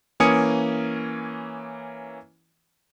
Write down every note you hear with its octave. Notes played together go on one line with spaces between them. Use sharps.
E3 A#3 C#4 G#5 D#6 C#7